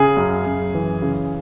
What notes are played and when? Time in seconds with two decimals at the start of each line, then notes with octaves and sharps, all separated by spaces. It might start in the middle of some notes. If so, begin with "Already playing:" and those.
Already playing: C#3 G#4
0.17 F#2
0.46 F#2
0.74 E3
1.02 C#3